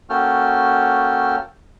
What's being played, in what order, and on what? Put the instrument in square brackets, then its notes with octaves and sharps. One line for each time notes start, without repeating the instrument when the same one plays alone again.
[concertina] A#3 C#4 F#4 A4 G5 F6